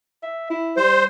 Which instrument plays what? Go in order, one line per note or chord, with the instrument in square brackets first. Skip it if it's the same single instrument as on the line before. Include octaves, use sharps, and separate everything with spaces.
[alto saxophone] E5
E4
[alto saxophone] G3 [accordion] C5